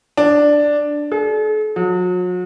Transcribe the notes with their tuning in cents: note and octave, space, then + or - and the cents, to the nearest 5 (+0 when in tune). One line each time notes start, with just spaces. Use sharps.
D4 +0
A4 -45
F#3 -40